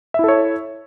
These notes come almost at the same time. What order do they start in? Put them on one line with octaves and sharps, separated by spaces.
E5 E4 A4 C#5